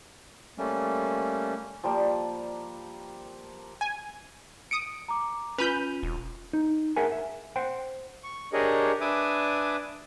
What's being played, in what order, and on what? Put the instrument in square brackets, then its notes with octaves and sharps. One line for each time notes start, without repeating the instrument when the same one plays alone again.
[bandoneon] G3 A3 A#3 C#4
[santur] F3 G3 A#3 G4
[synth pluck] G#5
[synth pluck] D#6 D7 [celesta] C#7
[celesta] A#5 D6
[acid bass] C#4 [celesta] F4 D#7 F7 [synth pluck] B4 B5 G6
[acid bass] E1
[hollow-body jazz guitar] D#4
G#4 A#4 E5 F#5 G#5
E5
C5 F#5 G5
[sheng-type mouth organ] C#6
D4 G4 G#4 A#4 C#5 D#5
D4 B4 E5 G#5 D6 D#6